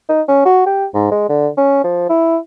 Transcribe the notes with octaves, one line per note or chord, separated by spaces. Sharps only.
D#4
C#4
F#4
G4
G#2
G#3
D3
C#4
F3
E4